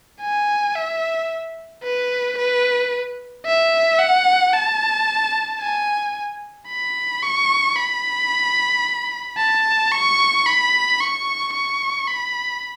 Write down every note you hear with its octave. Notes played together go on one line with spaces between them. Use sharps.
G#5
E5
B4
B4
E5
F#5
A5
G#5
B5
C#6
B5
A5
C#6
B5
C#6
C#6
B5